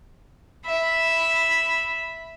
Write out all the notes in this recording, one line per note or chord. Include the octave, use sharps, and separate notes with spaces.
E5 B5